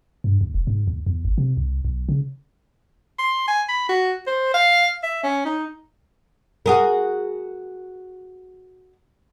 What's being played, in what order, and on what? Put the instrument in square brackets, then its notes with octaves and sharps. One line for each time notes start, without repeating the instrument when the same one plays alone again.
[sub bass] G2
D#2
E1
G#2
D#2
E2
G#1
C3
C2
B1
C#3
[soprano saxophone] C6
G#5
B5
F#4
C5
F5
E5
C#4
D#4
[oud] F#4 G#4 A#4